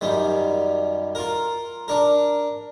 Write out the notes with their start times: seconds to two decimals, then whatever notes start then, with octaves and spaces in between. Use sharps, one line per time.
0.01 F#2 D#3 G3
1.15 F4 A#4
1.88 D4 A#4